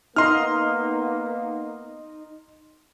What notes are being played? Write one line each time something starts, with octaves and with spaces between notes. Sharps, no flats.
A#3 B3 D#4 D#5 C6 F6